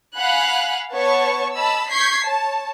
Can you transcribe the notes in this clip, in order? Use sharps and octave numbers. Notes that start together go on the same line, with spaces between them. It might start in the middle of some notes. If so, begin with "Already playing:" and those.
F5 F#5 G#5 B5 F#6
B3 C#5 A5 C#6
D#5 A5 B5 E6
C#6 G6 G#6 B6 C7
C#5 A5